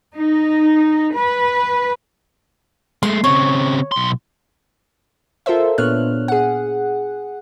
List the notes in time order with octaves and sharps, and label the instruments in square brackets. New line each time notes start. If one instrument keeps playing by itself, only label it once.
[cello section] D#4
B4
[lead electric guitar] G#3 A3 [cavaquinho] C6
[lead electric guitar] C#3 C4 [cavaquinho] C#5
[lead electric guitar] B1 C6
[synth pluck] F4 A4 A#4 C5 E5
A#2 B3 D4 C#5 F6 F#6
G#4 F#5